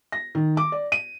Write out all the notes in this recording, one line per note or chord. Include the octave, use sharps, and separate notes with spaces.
A#6
D#3
D6
D5
D#7